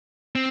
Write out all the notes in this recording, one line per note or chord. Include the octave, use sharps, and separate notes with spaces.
C4